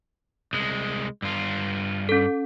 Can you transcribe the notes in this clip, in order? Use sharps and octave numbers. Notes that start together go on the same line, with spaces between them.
C2 G#3
G2 F4
C#4 A4